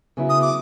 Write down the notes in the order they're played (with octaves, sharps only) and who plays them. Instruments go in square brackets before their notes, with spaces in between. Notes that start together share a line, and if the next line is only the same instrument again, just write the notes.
[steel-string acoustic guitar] C#3 F#3 B3 E4
[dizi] D#6
D6